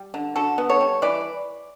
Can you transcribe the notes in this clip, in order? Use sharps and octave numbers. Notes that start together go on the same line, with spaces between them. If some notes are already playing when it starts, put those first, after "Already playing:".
Already playing: G3
D3
D3 F#4 A4
B3
A4 C#5
G3
E3 B4 D5